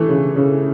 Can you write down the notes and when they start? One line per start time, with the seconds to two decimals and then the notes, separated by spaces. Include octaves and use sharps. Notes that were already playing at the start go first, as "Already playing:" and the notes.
Already playing: E3 A3
0.09 C#3
0.36 C#3